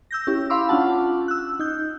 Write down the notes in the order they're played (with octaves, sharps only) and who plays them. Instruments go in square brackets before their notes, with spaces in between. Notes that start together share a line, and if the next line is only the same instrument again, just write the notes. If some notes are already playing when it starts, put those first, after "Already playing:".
[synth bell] E6 G6 A#6
C#4 E4 G4
F5 B5 C6 D6 E6
C#4 D4 F4 F#5 A5
E6 F#6
D#4 G6